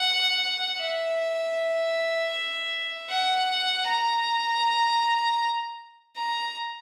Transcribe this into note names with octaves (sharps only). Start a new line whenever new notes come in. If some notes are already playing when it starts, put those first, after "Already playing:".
Already playing: F#5
E5
F#5
A#5
A#5